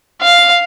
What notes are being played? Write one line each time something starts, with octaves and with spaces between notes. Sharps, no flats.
F5